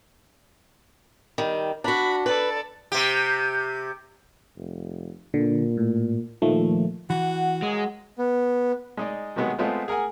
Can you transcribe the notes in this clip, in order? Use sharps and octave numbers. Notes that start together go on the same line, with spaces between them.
D#3 G3
D4 F#4 B5
A4 B4 D5
C3 G4
F1
A#2 D3
A2
A#2 D#3 F3 A3
E3 F#4 F#5 B5
F#3 G#3 A#3 G#4
B3
G#3 D#4 D5
C3 D#3 F#3 G#3 B3
G#3 A3 B3 C4 F4
G#4 A#4 F#5 G#5